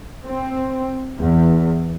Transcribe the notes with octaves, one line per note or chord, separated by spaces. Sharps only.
C4
E2